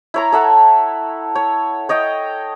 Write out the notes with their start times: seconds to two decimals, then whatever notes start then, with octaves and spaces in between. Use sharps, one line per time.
0.14 E4 C#5 A#5
0.32 A4 E5 F#5 A5
1.35 C#5
1.89 C#5 D#5 G5